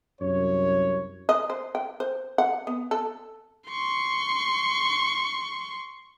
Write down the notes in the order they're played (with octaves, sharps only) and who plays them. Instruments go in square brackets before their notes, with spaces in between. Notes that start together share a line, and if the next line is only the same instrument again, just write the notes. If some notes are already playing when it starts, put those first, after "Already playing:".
[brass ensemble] C2 F#2 C#5
[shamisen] D#5
C5
G5
C5
F#5
B3
A4
[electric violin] C6 C#6